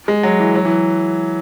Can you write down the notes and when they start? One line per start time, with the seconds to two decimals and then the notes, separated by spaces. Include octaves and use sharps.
0.08 G#3
0.23 F#3
0.40 E3
0.55 F#3
0.65 E3